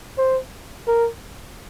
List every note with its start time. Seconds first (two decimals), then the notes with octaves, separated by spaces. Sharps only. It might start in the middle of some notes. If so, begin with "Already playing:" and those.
0.18 C5
0.87 A#4